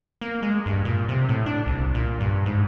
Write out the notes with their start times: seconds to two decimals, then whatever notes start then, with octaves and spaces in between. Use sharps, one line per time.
0.21 A#3
0.43 G#3
0.66 G2
0.85 A#2
1.08 C3
1.29 A2
1.46 D4
1.66 C2
1.94 A#2
2.20 G2
2.46 G#2